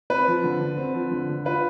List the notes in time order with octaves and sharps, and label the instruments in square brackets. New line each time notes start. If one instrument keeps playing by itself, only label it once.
[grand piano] C4 [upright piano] B4
[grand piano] F3
D3
D3
C4
F3
D3
D3
[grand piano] F4 [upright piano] B4